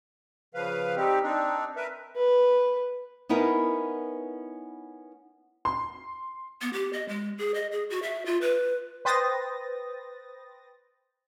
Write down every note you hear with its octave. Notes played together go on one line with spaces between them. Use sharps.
C#3 F3 B4 F5
G3 C4 D#4 G4
C4 D4 D#4
A#4 B4 E5
B4
B3 C#4 D#4 E4 A#4 B4
C6
B3
G4
D#5
G#3
G#4
D#5
G#4
F#4
E5
F4
B4
B4 C5 G5 D#6 A6 A#6